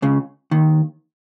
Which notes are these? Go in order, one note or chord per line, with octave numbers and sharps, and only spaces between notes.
C#2 C#3
D#2 D#3